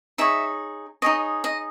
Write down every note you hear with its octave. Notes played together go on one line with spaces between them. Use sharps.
D#4 G#4 C#5 E5
D#4 G#4 C#5 D#5
D#5